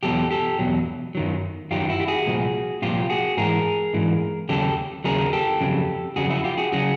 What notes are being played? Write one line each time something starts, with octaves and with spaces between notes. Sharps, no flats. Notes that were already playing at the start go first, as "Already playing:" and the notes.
E2 B2 F#3 G4 A4
G4 A4
E2 B2 F#3
F#2 D#3 F#3
F#2 D#3 F#3 F4 G4
E4 F#4
G4
F#4 G#4
C2 A#2 F3
C2 A#2 F3 F4 G4
F#4 G#4
G#2 E3 G#4 A#4
G#2 E3
D#2 C#3 F#3 G4 A4
D#2 C#3 F#3 G#4 A#4
G4 A4
F2 C#3 F#3
F2 C#3 F#3 F#4 G#4
E4 F#4
F4 G4
F#4 G#4
C#3 F#3 F#4 G#4